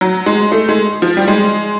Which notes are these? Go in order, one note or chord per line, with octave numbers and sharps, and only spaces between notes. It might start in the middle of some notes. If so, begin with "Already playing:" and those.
F#3
G#3
A3
G#3
F3
G3
G#3